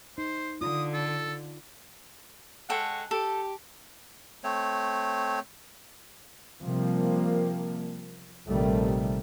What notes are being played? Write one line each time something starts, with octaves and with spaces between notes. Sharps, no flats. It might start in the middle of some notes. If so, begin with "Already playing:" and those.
D#4 C5
D3 F4 D#6
A4
G#3 A4 C#5 F#5 G5
G4 A4
A3 C4 C#5
C3 F3 G3 A#3
A#1 C3 D#3 G3 A3